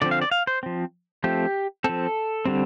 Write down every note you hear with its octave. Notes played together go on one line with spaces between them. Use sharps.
D3 F3 C4 D5
F5
D5
F5
C5
F3 C4
F3 A3 C4 G4
F3 C4 A4
D3 G3 C4